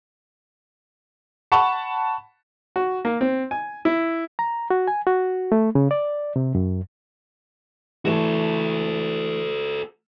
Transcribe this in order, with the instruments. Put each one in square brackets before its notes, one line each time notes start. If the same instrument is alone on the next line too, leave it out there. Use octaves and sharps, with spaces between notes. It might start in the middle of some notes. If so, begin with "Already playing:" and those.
[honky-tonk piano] F#5 A5 B5 C#6
[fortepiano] F#4
A#3
C4
G#5
E4
[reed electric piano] A#5
F#4
G#5
F#4
A3
C#3
D5
C3
F#2
[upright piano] E3 A3 E7 [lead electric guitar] F#4 A4